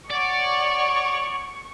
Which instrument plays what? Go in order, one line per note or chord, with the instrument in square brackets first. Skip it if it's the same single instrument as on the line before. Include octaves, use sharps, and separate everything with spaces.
[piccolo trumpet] C#5 [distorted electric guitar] D5 [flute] F#5 [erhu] C#6